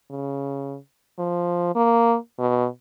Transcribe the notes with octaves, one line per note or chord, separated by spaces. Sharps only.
C#3
F3
A#3
B2